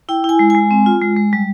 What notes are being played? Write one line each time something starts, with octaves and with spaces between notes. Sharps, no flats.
E4 G5
E4 G#5
G#3
G#3 G#5
C4
F4
G#3
G#3
G3